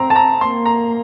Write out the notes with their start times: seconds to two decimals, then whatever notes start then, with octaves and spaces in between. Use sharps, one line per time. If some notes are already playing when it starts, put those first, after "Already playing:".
Already playing: C4 A#5
0.10 A5
0.16 A#5
0.41 A#3 C6
0.66 A#5